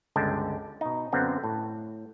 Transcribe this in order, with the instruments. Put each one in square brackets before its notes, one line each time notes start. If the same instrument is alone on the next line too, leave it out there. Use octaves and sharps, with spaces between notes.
[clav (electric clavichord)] G1 C#2 D3 G#3 G5 A5
B2 D#4
F#2 D3 B3 C4 F5
A2